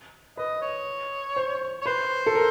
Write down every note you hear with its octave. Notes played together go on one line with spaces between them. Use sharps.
B4 D#5
C#5
C5
C#5
B4 C5
A4
A#4